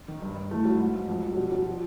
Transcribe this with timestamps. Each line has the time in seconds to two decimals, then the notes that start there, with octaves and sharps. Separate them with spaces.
0.08 D#3
0.22 G2
0.36 G2
0.51 E3 A3
0.65 G2 F#3
0.79 G#2
0.94 G#2
1.08 F2
1.23 F2
1.32 F#3
1.37 B2 G3
1.52 B2 F#3
1.66 F3